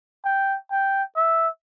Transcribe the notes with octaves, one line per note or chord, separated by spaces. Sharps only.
G5
G5
E5